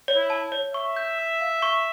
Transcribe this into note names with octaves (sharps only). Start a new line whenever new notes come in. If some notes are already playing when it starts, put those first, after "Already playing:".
C#5
E4
A5
C#5
E5 C#6
G6
E6
F5
C#6